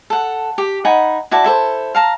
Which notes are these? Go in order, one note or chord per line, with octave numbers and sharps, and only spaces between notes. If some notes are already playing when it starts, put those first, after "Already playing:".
A4 F#5
G4
D#4 F#5 G#5 B5
E4 F#4 D5 A5
E4 A4 C5
F5 A5 A#5